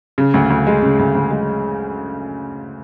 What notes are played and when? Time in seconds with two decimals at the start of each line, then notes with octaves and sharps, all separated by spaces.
0.18 C#3
0.34 D2
0.50 D2
0.67 G#3
0.82 C#3
0.99 D2
1.15 D2
1.31 G#3